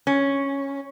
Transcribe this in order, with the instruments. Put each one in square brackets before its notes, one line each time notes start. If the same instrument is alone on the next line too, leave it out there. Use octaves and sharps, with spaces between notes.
[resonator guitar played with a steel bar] C#4